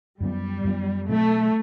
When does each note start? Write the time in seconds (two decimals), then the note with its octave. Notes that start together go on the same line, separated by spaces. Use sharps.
0.20 F#2 F#3 G3 B3
0.64 F#2 F#3 B3
1.09 B2 F#3 A3 C4